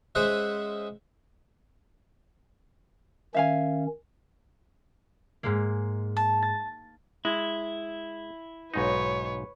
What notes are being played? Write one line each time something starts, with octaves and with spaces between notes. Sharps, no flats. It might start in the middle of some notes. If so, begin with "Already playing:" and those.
G#3 C#4 G#4 C5 E5 F#5
D#3 C#4 E5 F5 G#5
G#2 G#3 A#3
A5
A6
G#3 E4
B1 G#2 D#4 B4 C#5